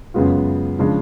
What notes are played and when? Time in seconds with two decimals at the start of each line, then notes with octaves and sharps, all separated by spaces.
0.14 F#2 C#3 G#3 B3 F4
0.79 C#3 F3 G#3 D4